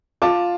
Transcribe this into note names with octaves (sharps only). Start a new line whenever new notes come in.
F4 A5 D6